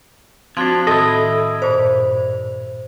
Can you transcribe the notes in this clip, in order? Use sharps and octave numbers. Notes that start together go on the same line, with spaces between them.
F3 C4 D4 F#4 C6 G#6
A2 D#3 E4 A4 D#5 A5
G2 A#2 C5 D5